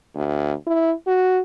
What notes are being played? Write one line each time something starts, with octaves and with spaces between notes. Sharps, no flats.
D2
E4
F#4